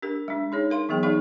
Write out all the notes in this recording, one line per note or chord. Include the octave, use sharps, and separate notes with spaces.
D4 G4 A#4
G#3 D4
D#4 G#4 C#5
A#4 F5 C6
E3 F#3 B3 G#4 G5
D#4 G#4 D5 F5 C#6